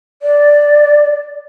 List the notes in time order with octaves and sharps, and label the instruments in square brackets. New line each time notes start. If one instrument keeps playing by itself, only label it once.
[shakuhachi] D5